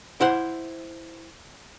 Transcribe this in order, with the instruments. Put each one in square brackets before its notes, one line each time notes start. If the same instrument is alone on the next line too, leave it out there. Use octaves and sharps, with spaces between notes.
[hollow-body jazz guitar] E4 C5 F#5